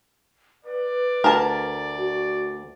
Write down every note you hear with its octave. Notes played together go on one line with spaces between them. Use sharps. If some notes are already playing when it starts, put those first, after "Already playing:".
B4 D5
D2 A#4 A5
F#4